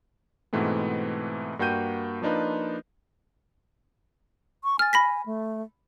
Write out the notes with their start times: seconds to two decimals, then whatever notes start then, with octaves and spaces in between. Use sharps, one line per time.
0.53 G#2 B2 E3 A3 B3 C4
1.59 G2 A#3 F#4 G5 G6 D#7
2.22 F3 A#3 D4 D#4 F4 B4
4.64 C#6
4.79 G#5 F6 A6
4.93 B5 A#6 B6
5.26 A3